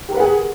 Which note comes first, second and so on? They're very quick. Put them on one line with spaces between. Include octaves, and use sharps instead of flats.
G4 A#4 B4 F#5 G#4